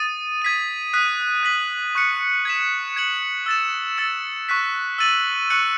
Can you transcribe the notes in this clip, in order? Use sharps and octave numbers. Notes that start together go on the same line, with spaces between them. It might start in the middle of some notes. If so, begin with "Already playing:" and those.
Already playing: D#6 A6 D#7
G#6 B6 D#7
D#6 F#6 B6 D#7
F#6 B6 F#7
C#6 F#6 C#7
G#6 B6 E7
G#6 C#7 F#7
E6 A6 E7
E6 A6 C#7
C#6 F#6 B6
E6 A6 D#7 F#7
C#6 F#6 C#7 F#7